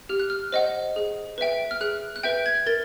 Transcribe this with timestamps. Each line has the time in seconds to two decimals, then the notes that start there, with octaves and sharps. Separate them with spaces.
0.09 G4 F6
0.20 F#6
0.30 F6
0.52 C5 D#5 F#5
0.96 G#4
1.38 B4 E5 G5
1.71 F6
1.81 G#4 F#6
2.16 F#6
2.23 B4 E5 G5 G6
2.46 G#6
2.67 A#4 A6